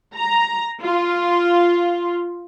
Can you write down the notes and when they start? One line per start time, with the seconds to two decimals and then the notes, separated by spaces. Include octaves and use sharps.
0.15 A#5
0.82 F4